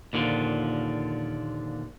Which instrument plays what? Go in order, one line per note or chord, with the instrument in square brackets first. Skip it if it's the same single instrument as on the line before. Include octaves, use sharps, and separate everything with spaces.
[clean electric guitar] D#2 A#2 D3 E3 F3